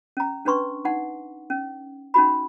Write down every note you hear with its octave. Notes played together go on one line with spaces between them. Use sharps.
C#4 A#5
C#4 D4 B4 C6 C#6
D#4 F#5
C#4
C#4 D#4 F#4 B5